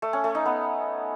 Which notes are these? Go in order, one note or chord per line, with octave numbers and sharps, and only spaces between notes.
A3
C#4
A3
D#4
B3